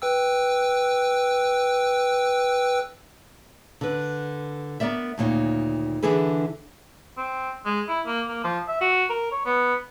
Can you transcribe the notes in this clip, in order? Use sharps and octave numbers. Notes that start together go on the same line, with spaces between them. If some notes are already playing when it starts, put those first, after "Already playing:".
B4 G5 E6
D3 B4
B3 A#4 D5 E5
D2 A#2 D#3 C#5
D3 E3 D4 G#4 A4 B4
C4
G#3
E4
A#3
A#3
F3
E5
F#4
A#4
C#5
B3